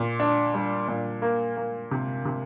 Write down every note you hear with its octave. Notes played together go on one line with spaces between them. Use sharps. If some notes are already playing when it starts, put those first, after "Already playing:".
Already playing: A#2
D4
G3
A#2
A#3
A#3
C3
C3